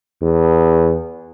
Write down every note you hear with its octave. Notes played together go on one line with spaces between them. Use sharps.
E2